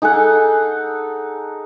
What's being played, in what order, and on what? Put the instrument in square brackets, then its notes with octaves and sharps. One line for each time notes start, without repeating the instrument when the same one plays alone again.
[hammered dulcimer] D#4 G#4 A4 F#5